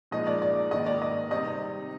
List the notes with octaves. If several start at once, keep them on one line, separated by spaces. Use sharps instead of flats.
A#2 F3 G#3 D#4 D#5
D5
D5
G#2 D#3 A#3 D#5
D5
D#5
C3 G3 C4 D#4 D#5